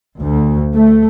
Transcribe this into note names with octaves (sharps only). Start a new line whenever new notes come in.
D2
A3